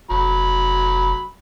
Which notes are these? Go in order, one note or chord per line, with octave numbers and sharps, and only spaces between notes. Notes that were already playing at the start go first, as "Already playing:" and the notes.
F1 F#3 B5